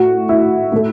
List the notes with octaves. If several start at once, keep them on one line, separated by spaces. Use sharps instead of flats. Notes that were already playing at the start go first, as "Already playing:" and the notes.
Already playing: A2 A3 F#4
E4
A2 A3